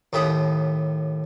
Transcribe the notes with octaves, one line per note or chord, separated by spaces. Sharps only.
D#2 A2 G4 B5 D#6